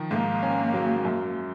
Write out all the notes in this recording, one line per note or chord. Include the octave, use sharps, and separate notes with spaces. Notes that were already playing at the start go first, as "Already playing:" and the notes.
Already playing: D#3 F3
G#2 A#3
C#4
F#3
F#2